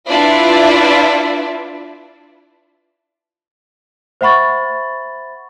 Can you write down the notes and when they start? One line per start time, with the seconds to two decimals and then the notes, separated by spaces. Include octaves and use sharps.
0.10 D4 E4 F4 B4 D5 E5
4.21 C5 E5 F#5 B5 C#6 A6